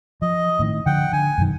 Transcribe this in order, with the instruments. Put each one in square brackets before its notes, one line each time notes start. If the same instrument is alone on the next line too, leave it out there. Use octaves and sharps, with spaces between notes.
[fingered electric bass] F3 [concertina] D#5
[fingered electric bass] A2 D#3
[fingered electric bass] D3 F3 [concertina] F#5 G5
[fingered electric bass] D3 [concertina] G#5
[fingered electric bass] F#2 B2 D#3